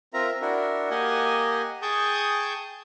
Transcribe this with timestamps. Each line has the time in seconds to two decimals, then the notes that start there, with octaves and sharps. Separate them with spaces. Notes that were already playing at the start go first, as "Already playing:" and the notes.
0.14 C4 F4 A#4 E5 A#5
0.41 D4 E4 F#4 A#4
0.91 A#3 G4 D#5 F#5 G#5
1.82 G#4 G5 A5 C#6 D#6 G6